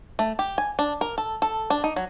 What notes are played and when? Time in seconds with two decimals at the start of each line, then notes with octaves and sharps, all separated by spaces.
0.19 A3
0.39 G4
0.58 G#5
0.79 D4
1.01 A#4
1.18 A4
1.42 A4
1.70 D4
1.84 D#4
1.96 F#3